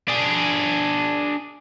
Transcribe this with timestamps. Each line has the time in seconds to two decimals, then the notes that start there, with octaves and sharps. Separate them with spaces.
0.08 D4 G#4